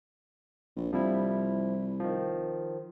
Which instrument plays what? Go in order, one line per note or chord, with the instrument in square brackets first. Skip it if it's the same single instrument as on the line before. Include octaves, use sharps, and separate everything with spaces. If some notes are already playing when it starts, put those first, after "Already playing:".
[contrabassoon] A#1
[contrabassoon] C2 [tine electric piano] F3 G3 E4
[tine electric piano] D#3 F3